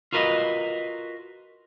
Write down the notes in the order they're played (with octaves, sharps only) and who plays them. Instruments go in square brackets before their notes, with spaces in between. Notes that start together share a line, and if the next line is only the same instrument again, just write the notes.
[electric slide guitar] F4 F#4 A#4 B4 D#5